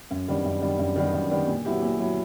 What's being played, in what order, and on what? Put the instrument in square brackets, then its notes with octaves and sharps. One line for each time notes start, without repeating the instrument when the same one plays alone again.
[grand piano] F#2
D#3 G3 B3 D4
F#2
D#3 G3 B3 D4
F#2
D#3 G3 B3 D4
F#2
D#3 G3 B3 D4
A#2
F#3 B3 E4 G4
A#2
F#3 B3 E4 G4